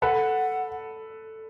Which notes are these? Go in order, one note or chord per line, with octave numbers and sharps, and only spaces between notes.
A4 B4 F#5